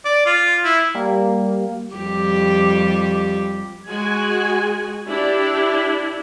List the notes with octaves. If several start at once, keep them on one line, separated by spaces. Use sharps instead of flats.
D5
F4
E4
G3 A#3
F2 G3 G4
G#3 F#4 G#5
D4 E4 G4